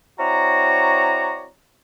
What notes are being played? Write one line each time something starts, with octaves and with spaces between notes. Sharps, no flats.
C4 E4 F#4 C#5 D5 A#5